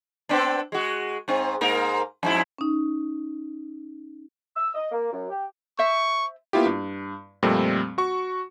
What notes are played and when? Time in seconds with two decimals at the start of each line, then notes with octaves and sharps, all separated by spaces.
0.29 B3 C4 D4
0.72 G#3 F#4
1.28 G#2 C4
1.61 G#2 A#3 A#4
2.23 F2 G#2 E4
2.58 C#4 D#4
4.56 E6
4.75 D#5
4.92 A#3
5.13 F#2
5.30 G4
5.79 C5 E5 C#6
6.53 A#3 B3 E4 F4 G4
6.66 G2
7.43 F2 A#2 G3 A3 C4
7.98 F#4 C#6